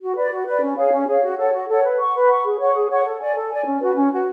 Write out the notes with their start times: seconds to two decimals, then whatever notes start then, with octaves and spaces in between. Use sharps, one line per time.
0.01 F#4
0.16 B4 D5
0.31 F#4
0.47 B4 D5
0.62 C#4
0.77 G#4 C#5 F5
0.92 C#4
1.07 G#4 C#5 F5
1.22 F#4
1.38 A4 C#5 F#5
1.53 F#4
1.68 A4 C#5 F#5
1.83 B4
1.99 F#5 C#6
2.14 B4
2.29 F#5 C#6
2.44 G#4
2.59 C#5 F#5 C#6
2.75 G#4
2.90 C#5 F#5 C#6
3.05 A4
3.20 D5 G#5
3.35 A4
3.50 D5 G#5
3.65 C#4
3.81 F#4 B4
3.96 C#4
4.11 F#4 B4